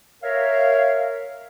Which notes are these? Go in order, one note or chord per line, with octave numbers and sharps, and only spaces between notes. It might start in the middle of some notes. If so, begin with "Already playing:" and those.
A#4 C#5 E5 F5